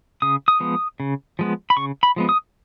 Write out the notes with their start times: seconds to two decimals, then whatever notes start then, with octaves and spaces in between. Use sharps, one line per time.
0.22 C#3 D#6
0.48 D#6
0.60 F3 G#3 B3
1.00 C#3
1.39 F3 G#3 B3
1.70 B5
1.77 C#3 C#6
2.03 B5
2.16 F3 G#3 B3
2.29 D#6